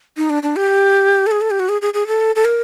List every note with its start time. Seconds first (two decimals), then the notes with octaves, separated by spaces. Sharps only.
0.17 D#4
0.30 D4
0.43 D4
0.56 G4
1.27 A4
1.31 G#4
1.41 A4
1.51 G4
1.60 F#4
1.69 G#4
1.82 G#4
1.94 G#4
2.07 A4
2.36 A4
2.45 A#4